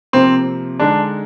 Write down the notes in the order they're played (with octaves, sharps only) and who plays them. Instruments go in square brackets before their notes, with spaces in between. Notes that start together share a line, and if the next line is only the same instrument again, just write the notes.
[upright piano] C3 F3 A#3 [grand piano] C4
[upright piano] D3 G#3 D#4 [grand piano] D4